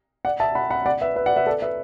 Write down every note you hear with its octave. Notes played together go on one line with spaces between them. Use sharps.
D5 F#5
E5 A5
F#5 B5
F#5 B5
D5 F#5
B4 E5
B4 E5
D5 F#5
B4 E5
A4 D5
B4 E5